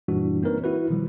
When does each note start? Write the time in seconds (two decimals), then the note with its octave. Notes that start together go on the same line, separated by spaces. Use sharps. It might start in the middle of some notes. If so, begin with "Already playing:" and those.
0.08 F#2 A#2 E3 G3 D4 F#4
0.43 A#3 C4 D#4 A#4 B4 C#5
0.64 E4 F#4 B4
0.90 B2 D#3 F3 G3